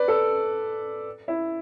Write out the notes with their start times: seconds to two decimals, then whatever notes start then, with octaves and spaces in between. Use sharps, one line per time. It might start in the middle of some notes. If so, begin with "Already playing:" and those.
Already playing: B4 D5
0.08 A4
1.28 E4